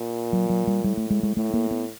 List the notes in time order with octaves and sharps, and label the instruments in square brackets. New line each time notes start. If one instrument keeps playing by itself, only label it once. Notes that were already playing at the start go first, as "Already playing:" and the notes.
Already playing: [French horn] A#2
[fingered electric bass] F#3
F#3
G3
[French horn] A2 [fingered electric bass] G3
[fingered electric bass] A3
G#3
G#3
[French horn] A2 [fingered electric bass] A3
[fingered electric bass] A#3
B3